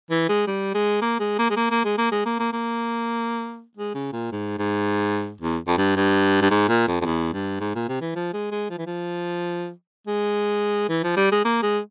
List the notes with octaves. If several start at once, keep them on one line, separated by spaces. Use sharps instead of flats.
E3
G#3
G3
G#3
A#3
G#3
A#3
G#3
A#3
A#3
G#3
A#3
G#3
A#3
A#3
A#3
G#3
C#3
A#2
G#2
G#2
E2
F2
G2
G2
G2
G#2
A#2
F2
F2
E2
G2
G#2
A#2
C3
E3
F3
G#3
G#3
F3
E3
F3
G#3
E3
F3
G3
G#3
A#3
G#3